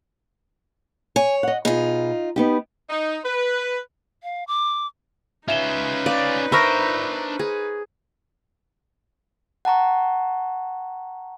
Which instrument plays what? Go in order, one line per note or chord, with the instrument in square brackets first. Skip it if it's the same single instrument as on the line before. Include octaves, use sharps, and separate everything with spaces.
[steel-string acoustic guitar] C#5 [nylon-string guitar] G#5
[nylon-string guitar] D#5 F#5
[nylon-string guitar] B2 G#4 [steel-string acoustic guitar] D#4 F4
[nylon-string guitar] B3 D#4 G4
[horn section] D#4
B4
[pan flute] F5
D6
[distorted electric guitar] C#4 F4 [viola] D#4 B4 [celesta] E5 E7 G7
[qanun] D5 [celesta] F5
[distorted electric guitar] D4 A#5 [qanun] A#4 C5 E5 [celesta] B5 C#6 A#6
[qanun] G#4
[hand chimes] F#5 A5 A#5 C#6